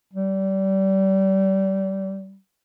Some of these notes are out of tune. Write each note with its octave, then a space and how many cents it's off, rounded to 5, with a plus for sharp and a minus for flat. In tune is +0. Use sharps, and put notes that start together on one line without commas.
G3 -30